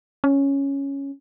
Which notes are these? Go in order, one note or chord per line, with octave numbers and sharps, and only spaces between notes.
C#4